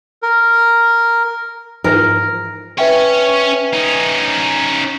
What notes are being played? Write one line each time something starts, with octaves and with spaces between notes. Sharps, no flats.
A#4
G#2 E3 F3 A#4
C#4 B4 C#5 E5 G5
C#4 D#4